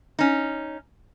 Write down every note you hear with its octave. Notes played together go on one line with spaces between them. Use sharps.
C#4 D#4